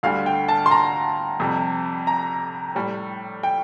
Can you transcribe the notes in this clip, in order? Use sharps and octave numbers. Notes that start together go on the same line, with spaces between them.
D2 D3 G3 F5
G5
A5
C6
A#5
F2 C3 G3
A#5
A2 G3
G5